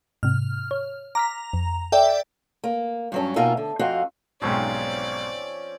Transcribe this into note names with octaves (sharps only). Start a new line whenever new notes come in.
G#2 C3 F6
C#5
A#5 D6 F6 B6
F2
A4 D5 E5 G5
A#3
G2 F#3 C#4
B2 A#3 D#4 F4 E5 G#5
D3
F2 C4 F#4 D#5 F5
B1 G#2 B2 F3 C4 C#4 D5